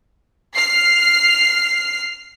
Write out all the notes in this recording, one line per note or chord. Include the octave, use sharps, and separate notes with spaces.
F6 C7